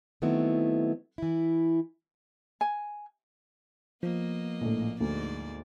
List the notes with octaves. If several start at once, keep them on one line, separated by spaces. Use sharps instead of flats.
D#3 F#3 A3 B3 C4 E4
E3 E4
G#5
F3 A#3 B3 D#5
A#1 A2
D2 G#2 A#3 D5